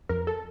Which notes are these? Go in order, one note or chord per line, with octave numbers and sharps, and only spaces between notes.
F2 A#4
A4